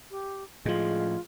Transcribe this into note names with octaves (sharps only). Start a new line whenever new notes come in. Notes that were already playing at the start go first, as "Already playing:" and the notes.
G4
A2 F3 G#3 F4